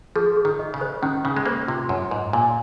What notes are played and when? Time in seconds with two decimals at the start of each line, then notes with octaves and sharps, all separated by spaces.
0.16 F3 G#4
0.37 G#4
0.45 D#3
0.59 D#5
0.74 C#3
0.81 C5
1.02 D#3 C#4
1.24 C#3 C#4
1.37 G#3
1.46 A#3 C5
1.68 C3 F4
1.89 F#2 C6
2.11 G#2 C5
2.33 A#2 G#5